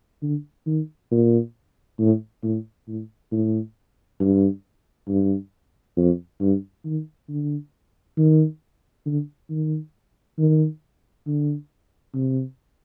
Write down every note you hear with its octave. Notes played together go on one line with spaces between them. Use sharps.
D3
D#3
A#2
A2
A2
A2
A2
G2
G2
F2
G2
D#3
D3
D#3
D3
D#3
D#3
D3
C3